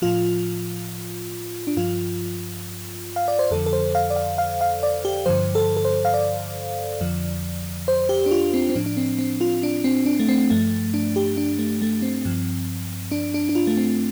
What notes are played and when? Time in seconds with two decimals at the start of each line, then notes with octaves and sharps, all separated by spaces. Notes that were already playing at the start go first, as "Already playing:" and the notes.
0.02 A2 F3 F4
1.67 D4
1.77 G2 F3 F4
3.16 F5
3.28 D5
3.39 C5
3.51 F2 D3 F3 A4
3.66 A4
3.73 C5
3.95 F5
4.10 D5
4.16 F5
4.38 F5
4.61 F5
4.83 D5
5.05 G4
5.26 G2 D3 F3 C5
5.55 A4
5.77 A4
5.85 C5
6.05 F5
6.14 D5
7.01 F2 D3 F3
7.88 C5
8.09 G4
8.26 D4
8.31 F4
8.54 C4
8.70 C4
8.76 A2 F3 D4
8.86 D4
8.97 C4
9.19 C4
9.41 F4
9.63 D4
9.84 C4
10.06 D4
10.19 A3
10.29 C4
10.50 G2 F3 A3
10.94 D4
11.16 G4
11.37 D4
11.59 A3
11.82 A3
12.02 C4
12.25 G2 F3
13.11 D4
13.34 D4
13.49 D4
13.55 F4
13.67 A3
13.77 C4